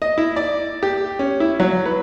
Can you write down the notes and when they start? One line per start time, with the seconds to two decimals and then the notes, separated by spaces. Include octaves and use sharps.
0.02 D#5
0.18 E4
0.36 D5
0.83 G4
1.19 C#4
1.40 E4
1.60 F#3
1.85 B4